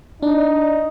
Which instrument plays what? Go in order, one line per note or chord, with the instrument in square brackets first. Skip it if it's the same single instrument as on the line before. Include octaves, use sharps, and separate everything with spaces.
[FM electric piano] D4 [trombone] D#4